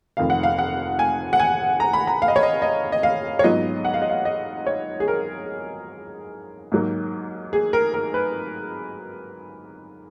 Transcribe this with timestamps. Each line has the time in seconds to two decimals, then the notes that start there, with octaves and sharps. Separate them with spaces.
0.17 F1 F2 D#3 F5
0.30 F#5
0.43 F5
0.59 F#5
0.99 G#5
1.33 F#5
1.40 G#5
1.80 A#5
1.93 B5
2.07 A#5
2.22 F5
2.28 D#5
2.36 C#5
2.43 D#5
2.62 D#5
2.92 D#5
3.03 F5
3.39 C#5
3.44 G#2 F#3 B3 F4 D#5
3.85 F#5
3.94 F5
4.02 D#5
4.10 F5
4.25 D#5
4.67 C#5
5.00 G#4
5.08 A#4
6.72 G#2 F#3 A#3
7.53 G#4
7.73 A#4
7.94 A#4
8.14 B4